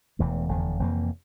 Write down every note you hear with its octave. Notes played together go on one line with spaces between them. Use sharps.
E1 E2 E3 A3
F1 E2 D3
F1 F2 E3 A#3